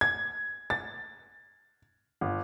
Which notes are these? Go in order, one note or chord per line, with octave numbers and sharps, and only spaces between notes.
G#6
A6
G1